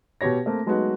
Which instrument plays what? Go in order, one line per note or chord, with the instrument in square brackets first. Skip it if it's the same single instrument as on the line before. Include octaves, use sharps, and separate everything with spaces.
[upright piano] B2 B3 G4 C#5 A#6
A3 A#3 C4
F#3 G#3 A3 B3 D#4 F#4